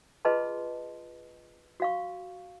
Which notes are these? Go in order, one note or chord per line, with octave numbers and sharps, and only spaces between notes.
F4 G#4 B4 D#5 A5 C6
F#4 F5 C#6